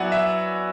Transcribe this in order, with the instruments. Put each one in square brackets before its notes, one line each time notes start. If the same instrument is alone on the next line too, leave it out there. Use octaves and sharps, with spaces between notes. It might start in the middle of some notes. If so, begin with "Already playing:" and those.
Already playing: [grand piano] F#3 B3 E4 D5 F#5 G#5
E5